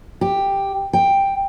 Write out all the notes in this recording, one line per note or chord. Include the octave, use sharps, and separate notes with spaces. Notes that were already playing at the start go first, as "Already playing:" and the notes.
G4
G5